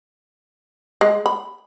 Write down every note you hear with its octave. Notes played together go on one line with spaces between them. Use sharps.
G#3
B5